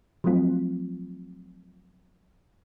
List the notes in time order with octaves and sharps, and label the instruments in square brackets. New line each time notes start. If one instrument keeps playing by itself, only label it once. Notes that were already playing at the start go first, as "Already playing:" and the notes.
[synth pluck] F3 F#3 A3 C4 F4